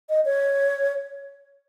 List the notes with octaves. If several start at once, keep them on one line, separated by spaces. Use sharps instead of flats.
D#5
C#5